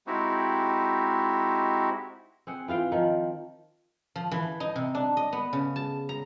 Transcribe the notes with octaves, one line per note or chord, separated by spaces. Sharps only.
G#3 C4 D#4 E4 F#4 G4
C4 G#4 F#5
E3 F4 F5 G5
D#3 F3
F3
E3
D#4
C3
D4
D#5
B3
C#3
A5
A#5